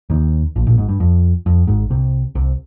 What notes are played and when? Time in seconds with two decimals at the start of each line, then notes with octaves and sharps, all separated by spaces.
0.10 D#2 D#3
0.56 A#1 A#2
0.67 A#1 A#2
0.78 G#1 G#2
0.89 G2
1.00 F2
1.46 F2
1.67 G#1 G#2
1.90 C2 C3
2.35 C2 C3